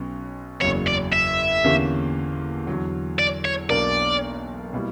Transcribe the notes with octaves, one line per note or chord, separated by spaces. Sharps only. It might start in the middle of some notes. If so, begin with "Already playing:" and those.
Already playing: B1 B2 F#3 C#4
F#1 E2 C#3 F#3 C#5
D5
E5
E2 D3 A#3 C#4 G4
E2 D3 F#3
D5
C#5
B1 B2 A#3 D4 A#4 D5
B2 G3 A#3 E4